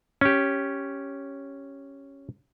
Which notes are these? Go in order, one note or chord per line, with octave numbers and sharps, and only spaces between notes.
C#4 G4